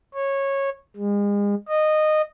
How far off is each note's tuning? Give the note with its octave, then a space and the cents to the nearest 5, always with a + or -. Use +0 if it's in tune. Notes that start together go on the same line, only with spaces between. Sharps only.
C#5 -15
G#3 -35
D#5 -15